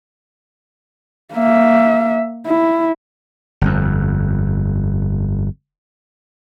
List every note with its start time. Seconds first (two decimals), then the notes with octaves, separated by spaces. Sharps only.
1.35 A#3 E5
2.47 E4
3.61 G1 F2